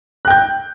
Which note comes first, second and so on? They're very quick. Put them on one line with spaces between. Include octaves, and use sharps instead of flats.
F#6 G5 G6